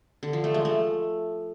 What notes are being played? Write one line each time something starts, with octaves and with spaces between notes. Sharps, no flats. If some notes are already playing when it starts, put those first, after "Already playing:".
D3
F3
A3
G#3
A3